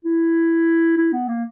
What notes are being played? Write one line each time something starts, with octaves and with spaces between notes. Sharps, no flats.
E4
E4
B3
A#3